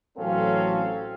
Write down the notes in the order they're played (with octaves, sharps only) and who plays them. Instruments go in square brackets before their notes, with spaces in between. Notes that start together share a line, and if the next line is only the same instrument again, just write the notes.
[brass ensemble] A1 F#3 C4 C#4 A4 F5